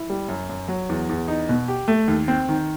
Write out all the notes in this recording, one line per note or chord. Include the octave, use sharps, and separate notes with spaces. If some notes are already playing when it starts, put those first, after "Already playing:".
Already playing: E4
G3
F#2
F#2
F#3
E2
E2
D#4
B2
G4
A3
D#2
C4
D#3